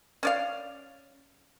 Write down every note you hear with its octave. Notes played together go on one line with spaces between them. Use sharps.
C#4 D5 F5